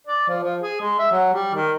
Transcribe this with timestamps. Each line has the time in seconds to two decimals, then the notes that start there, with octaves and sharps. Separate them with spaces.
0.07 D5
0.28 F3
0.44 F3
0.61 G#4
0.81 G#3
0.99 E5
1.12 F#3
1.33 G3
1.54 D#3